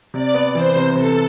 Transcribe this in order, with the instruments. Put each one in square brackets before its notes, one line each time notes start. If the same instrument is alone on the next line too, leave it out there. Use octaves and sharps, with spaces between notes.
[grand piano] C3 [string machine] D5
[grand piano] B3
[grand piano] E3 [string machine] C5
[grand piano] C3
[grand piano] C3 [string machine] A4